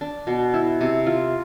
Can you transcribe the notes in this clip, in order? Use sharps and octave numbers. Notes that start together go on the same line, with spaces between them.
D4
B2
E4
C3
F4